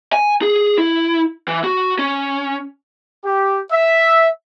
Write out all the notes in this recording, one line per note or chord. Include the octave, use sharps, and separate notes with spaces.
G#5
G#4
E4
E3
F#4
C#4
G4
E5